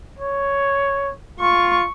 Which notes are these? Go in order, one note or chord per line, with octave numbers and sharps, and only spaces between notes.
C#5
F4 C#6